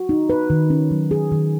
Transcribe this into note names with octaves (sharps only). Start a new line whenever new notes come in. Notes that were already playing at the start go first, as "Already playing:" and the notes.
Already playing: F#4
D#4
B4
D#3
C#4
F#3
G#4
D#3